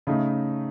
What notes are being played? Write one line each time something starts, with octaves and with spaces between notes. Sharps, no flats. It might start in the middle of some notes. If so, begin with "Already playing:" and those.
C#3 A3 D#4